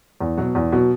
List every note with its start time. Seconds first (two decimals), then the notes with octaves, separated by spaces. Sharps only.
0.21 E2
0.37 B2 F#3
0.55 E2
0.72 B2 F#3